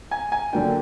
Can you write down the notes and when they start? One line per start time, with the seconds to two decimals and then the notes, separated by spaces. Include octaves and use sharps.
0.11 G#5
0.32 G#5
0.53 D3 F#3 A#3 D4 G5